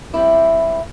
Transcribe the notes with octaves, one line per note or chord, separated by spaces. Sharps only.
G3 C4 E4 G4